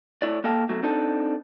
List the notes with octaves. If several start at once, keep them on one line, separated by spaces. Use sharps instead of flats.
A2 E4 C#5 D5
A#3 A4 D#5 F5 G5 A5
B2 F#3 A3
C4 D4 D#4 A4